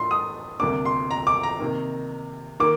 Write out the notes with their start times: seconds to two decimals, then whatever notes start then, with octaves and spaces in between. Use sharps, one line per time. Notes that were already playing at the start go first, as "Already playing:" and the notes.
Already playing: A2 A3 D4 F4 C6
0.11 D#6
0.60 D2 C3 G3 A#3 D4 D6
0.85 C6
1.11 A#5
1.27 D6
1.43 A#5
1.60 C3 D#3 A#3
2.60 D#3 A#3 D6